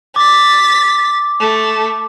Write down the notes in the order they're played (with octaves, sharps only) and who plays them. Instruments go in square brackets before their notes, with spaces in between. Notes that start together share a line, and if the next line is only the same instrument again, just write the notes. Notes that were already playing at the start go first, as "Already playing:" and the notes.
[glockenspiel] D6 [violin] A6 B6
[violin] A3